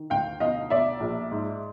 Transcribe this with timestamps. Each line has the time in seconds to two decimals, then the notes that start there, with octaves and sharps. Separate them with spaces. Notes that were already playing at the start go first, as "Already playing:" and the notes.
Already playing: D#3
0.10 D2 F5 G5
0.40 B1 D#5 F5
0.70 B1 D5 E5
1.00 A#1
1.31 G#2